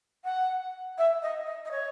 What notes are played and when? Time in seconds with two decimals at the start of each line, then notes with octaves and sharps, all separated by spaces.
0.24 F#5
0.98 E5
1.22 D#5
1.46 D#5
1.65 D#5
1.71 C#5